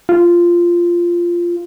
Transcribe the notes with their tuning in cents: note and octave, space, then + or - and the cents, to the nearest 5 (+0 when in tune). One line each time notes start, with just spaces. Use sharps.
F4 -10